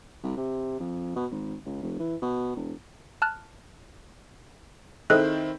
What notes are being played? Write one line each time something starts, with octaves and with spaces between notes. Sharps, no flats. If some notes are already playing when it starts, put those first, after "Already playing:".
C2
C3
F2
B2
G#1
C#2
F1
E3
B2
E1
A5 F6 F#6
D#3 C4 E4 G#4 A4 D#5 F#6